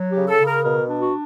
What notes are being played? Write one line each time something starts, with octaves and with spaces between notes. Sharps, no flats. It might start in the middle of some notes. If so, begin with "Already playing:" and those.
Already playing: F#3
G4
C#3
A4
C#3
A#4
B2 A#4
D4
F#4